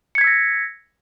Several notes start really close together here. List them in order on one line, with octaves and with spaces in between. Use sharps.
C#7 G#6 B6 E6 A#6